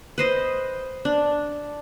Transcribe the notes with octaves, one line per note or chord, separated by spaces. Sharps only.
B4 C5 D#5
D4